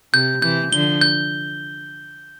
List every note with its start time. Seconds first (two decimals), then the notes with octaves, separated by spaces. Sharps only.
0.13 C3 G6
0.42 C3 E3 G6
0.72 D3 F3 G7
1.01 G6